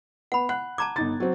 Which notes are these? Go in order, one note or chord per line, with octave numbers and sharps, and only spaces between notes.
B3 F#5 B5
F#5 F#6
A5 A#5 D6 G#6
G1 D#4 A6
F#3 C4